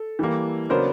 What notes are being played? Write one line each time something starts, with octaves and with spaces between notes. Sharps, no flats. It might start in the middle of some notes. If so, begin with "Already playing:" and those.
Already playing: A4
E3 G3 A#3
C#3 F#3 B3 D4 A#4 C5